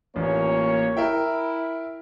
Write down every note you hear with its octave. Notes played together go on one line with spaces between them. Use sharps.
A1 A#2 A#3 C#5
E4 A#4 E5 G5